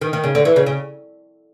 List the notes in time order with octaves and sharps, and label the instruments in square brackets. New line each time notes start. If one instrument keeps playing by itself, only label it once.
[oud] D#3
D#3
C#3
D3
E3
C#3
C#3